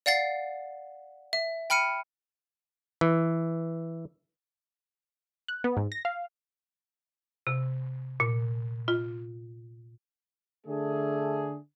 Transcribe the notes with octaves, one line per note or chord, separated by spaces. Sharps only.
D5 F5 F#5 A6 C7
E5
G5 B5 F6 C#7 D#7
E3
F#6
B3
G#2
A#6
F5
C3
A#2
F4
D3 A3 D4 G#4